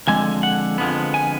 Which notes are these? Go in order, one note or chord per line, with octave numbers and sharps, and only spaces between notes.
F2 D3 G#3 G#5
F#5
F2 D3 F3 G#3 B3
G#5